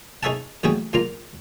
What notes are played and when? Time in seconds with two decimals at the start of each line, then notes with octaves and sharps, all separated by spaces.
0.23 D#4 G#4 C#5 E5 F#5 A5
0.63 A1 C#3 G3 F#4 G#4 G5
0.93 C#2 A#2 F4 A#5